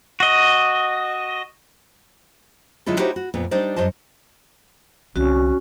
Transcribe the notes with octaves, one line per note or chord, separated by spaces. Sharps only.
F#4 D#5
D3 F#3 G#3 E4 F4 A4
D#4 E4 F#4 G4 C5 C#5
F#4
F2 A#2 B3
G3 D4 D#4 C5 D5
F#2 G3 C5 D#5 A5
C2 D3 C#4 F#4